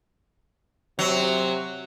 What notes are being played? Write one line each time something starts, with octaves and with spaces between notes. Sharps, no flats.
C3 F#3